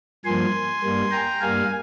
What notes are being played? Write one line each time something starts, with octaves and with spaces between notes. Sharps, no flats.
G2 F3 A#3 G#5 C6
G2 G3 A#3
G5 A#5
G2 G3 A#3 F5 G#5